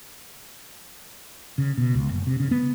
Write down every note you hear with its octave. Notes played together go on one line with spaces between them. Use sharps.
C#3
B2
C#2
F#1
C3
C#3
B3